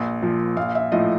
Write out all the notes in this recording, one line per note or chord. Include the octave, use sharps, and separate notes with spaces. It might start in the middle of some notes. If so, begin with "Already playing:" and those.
Already playing: A#1
A#2 F3
A#1 F5
E5
A2 F3 D#5